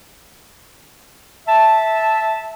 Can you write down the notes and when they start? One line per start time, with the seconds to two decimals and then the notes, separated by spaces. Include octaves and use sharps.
1.47 E5 A5